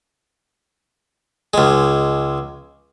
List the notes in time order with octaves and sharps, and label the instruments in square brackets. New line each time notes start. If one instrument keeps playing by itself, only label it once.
[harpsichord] C#2 G#3